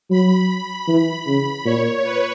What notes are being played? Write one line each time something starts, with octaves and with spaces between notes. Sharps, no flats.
F#3 B5
E3
C#3
A#2 C#5
B4